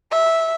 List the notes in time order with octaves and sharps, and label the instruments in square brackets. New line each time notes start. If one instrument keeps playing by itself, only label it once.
[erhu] E5